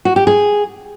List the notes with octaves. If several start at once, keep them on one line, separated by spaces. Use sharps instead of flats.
F#4
G4
G#4